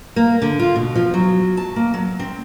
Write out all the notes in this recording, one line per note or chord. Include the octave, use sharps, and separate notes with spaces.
A#3
D3
F4
B2
F3
F#3
A5
A#3
F#3
C4